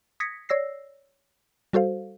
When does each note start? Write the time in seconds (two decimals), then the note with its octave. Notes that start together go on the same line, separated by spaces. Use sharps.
0.20 D#6 G#6 A#6 B6 C#7
0.49 C#5 D5 E6 A#6 C7
1.73 G3 F#4 A4 C5 F5